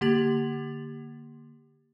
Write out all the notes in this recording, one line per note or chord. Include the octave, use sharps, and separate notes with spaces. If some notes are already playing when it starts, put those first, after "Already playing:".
D3 A#3 G4 A6 F#7